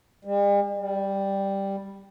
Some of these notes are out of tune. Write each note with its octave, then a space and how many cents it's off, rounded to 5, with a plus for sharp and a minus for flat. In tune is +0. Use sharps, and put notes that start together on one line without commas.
G3 +45
G3 +0